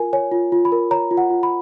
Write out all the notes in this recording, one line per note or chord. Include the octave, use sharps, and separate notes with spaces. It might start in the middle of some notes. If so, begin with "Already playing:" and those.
Already playing: F4 A#4 G#5
C#5 G#5
F4
F4
B5
A#4
C#5 A#5
F4
F#5
F4
B5